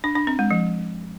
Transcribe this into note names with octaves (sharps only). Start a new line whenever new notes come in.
D4
D4
C4
G#3
F3